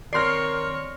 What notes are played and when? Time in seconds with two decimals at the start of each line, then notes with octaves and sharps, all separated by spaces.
0.13 D#3 C4 C#5 D5 C6 F6 A#6 C7